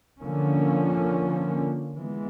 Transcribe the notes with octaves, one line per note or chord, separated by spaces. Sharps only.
D3 F3 A#3 C#4
E3 G#3 B3